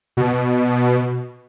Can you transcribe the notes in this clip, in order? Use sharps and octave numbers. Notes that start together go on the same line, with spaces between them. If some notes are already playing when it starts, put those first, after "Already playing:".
B2